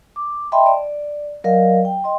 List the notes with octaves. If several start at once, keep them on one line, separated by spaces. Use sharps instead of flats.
D6
D#5 E5 G5 A5 B5 C6
D5
F#3 A#4 D5 D#5 F5
G5
D#5 G5 C6